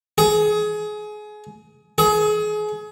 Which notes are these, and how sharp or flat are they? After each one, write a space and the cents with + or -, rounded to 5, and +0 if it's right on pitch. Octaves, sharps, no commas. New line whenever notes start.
G#4 +25
G#4 +30